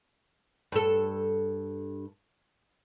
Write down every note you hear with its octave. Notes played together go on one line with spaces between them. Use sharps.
G2 A4